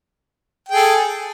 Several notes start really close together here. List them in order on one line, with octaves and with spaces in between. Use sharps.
G5 G#4 A4